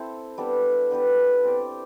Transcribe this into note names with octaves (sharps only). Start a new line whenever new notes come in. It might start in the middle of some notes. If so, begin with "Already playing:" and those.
Already playing: C4 E4 A4 C5
G3 B3 D4 A4
B3 D4 G4 B4
C4 G4 D5